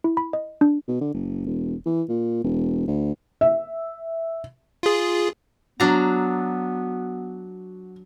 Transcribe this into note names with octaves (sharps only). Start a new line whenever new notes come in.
E4
B5
D#5
D4
B2
D3
F#1
E1
E3
A#2
E1
D2
E5
F4 G#4
F#3 B3 D4 F#4 A#5